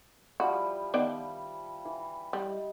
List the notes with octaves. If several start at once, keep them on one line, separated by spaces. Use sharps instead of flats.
F3 G3 E4 F#4
D#3 B3 D5
E3
G3 D#5